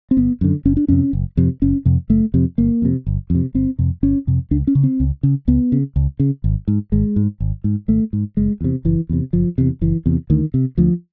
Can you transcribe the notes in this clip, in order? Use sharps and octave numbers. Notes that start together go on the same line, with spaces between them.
C4
G1 B3
F#2 D3
F#1 C#4
D4
F2 C3 C#4
F#1
F2 C3
F#1 C#4
F2 C3
F#1 A3
F2 C3
G1 A#3
F2 C3
G1
F2 C3
G1 C4
F2 C3
G1 C#4
F2 C3
C#2 D4
C#4
C#3
C4
C#2
C#3
C#2 B3
C#3
C#2
C#3
G#1
G#2
G#1 G#3
G#2
G#1
G#2
G#1 A3
G#2
F#1 G#3
E2 C3
F#1 E3
E2 C3
F#1 F3
E2 C3
F#1 E3
E2 C3
D2 D#3
C3
D2 F3